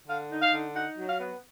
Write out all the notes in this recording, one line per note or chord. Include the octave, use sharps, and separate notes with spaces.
D3 F5
D#4
F5
D3
D#4 F#5
F#3
F5
B3